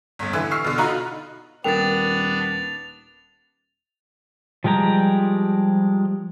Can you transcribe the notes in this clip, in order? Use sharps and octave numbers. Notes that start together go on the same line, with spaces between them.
G1 D2
D3 E3
C#6 E6 F6 C7
B2 D3
D#4 F4 F#4 D#5 A#5 B5
D#1 B3 D4 A#4 G5 A6 F7
F3 G3 G#3 G5 A#5